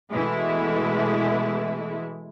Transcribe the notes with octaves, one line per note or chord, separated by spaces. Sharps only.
B2 E3 G#3 A3 E4